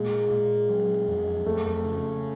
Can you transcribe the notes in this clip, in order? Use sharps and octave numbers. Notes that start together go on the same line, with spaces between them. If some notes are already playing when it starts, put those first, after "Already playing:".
Already playing: A#2 G#3
A#2
F#3
F2
F2 A3
A3
C#3